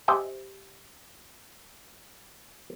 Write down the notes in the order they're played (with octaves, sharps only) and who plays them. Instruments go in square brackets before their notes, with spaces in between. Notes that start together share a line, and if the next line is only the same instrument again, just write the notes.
[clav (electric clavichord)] G4 C5 D#5 E5 G5 G#5